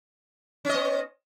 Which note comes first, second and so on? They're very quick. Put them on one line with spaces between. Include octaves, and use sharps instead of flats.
C#4 D#5 B3